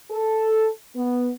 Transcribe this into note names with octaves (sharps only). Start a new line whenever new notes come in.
A4
B3